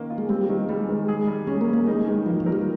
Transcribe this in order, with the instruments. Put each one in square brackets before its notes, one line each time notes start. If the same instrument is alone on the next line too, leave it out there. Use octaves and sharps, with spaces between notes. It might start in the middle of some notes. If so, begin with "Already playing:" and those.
Already playing: [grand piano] D#3 A#3 C#4
F4
[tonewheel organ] G#3
[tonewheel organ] G3 [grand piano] C4
[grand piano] D#3
[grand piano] G3 [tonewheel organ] G#3
[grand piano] D#3
G#4
G3
[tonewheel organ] G#3 [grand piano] C#4
[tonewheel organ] A#3
[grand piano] G3
[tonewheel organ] A#3
[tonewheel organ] G#3 [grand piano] D#4
[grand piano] D#3
[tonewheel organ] F3 [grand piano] A#3
[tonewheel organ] F3
[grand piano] A#4
[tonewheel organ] G3